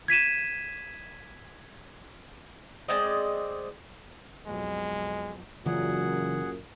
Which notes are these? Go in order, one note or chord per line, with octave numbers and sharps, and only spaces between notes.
G#6 B6 D#7 E7
G#3 C4 D5 D#5
B1 F2 G#3
F#2 A#2 C#3 E3 F#3 G#4 F#5